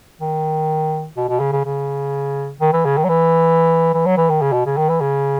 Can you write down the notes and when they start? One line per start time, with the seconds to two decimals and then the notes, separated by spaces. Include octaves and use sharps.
0.20 D#3
1.17 B2
1.29 B2
1.40 C#3
1.52 C#3
1.65 C#3
2.60 D#3
2.73 E3
2.85 C#3
2.97 D#3
3.04 F#3
3.09 E3
3.94 E3
4.06 F#3
4.17 E3
4.29 D#3
4.41 C#3
4.53 B2
4.66 C#3
4.77 D#3
4.89 E3
5.01 C#3